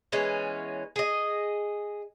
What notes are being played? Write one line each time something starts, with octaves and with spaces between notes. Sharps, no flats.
E3 G#3 B3 C#4
G#4 D#5